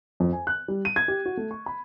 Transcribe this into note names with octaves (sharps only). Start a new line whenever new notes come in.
F2
G#5
F#6
G3
D#7
G#6
G4
F#4
A3
C#6
B5